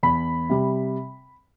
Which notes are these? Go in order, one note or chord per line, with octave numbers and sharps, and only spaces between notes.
E2 B5
C3 G3